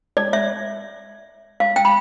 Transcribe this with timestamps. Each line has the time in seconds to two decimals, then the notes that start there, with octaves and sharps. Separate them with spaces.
0.17 D5
0.33 E5
1.60 F5
1.76 G5
1.85 B5